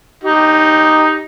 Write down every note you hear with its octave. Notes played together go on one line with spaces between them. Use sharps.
D#4 G4